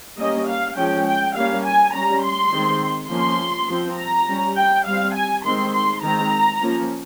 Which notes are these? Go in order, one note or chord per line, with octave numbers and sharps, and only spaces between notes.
G3 A#3 C#4 D#5
F5
F3 G#3 C#4 G5
G5
G3 A#3 C#4 F5
G#5
G3 C#4 A#5
C6
D#3 G#3 C4
F3 A#3 C#4 C6
F3 C4
A#5
G3 C#4
G5
G3 C4 F5
G#5
D#3 G#3 C4 C6
C6
D#3 G#3 C4 A#5
F3 A#3 C#4